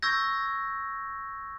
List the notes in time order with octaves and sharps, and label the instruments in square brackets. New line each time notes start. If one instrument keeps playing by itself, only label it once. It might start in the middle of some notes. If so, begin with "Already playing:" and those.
[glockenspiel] C#6 E6 G6 G#6 A#6